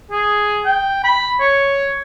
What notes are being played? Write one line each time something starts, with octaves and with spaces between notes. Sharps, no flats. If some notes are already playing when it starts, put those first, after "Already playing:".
G#4
G5
B5
C#5